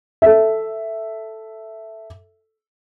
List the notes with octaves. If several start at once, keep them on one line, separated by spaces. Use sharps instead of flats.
A4 E5